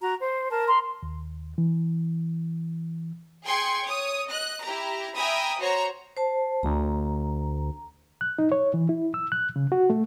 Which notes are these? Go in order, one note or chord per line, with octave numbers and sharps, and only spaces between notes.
F#4 A#5
C5
A#4 A5
A#5 C6
D#2
E3
G#4 G5 C6 G#6 C#7
C#5 D#6
D#5 F#6
E4 G4 A#5
E5 G5 G#5 A#5 B5 D#6
F#4 C5 C#5 A#5
C5 A5
D2 A#5
F#6
D#4
C#5
E3
E4
E6
F#6
C#3
F#4
A3